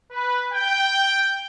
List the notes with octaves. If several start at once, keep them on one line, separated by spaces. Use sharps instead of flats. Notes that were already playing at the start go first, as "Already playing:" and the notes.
B4
G5